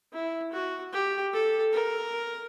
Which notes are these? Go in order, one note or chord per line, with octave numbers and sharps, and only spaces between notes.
E4
F#4
G4
A4
A#4